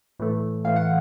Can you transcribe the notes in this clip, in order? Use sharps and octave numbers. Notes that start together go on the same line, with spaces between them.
A2 E3 A3
A2 E3 A3 F5
F#5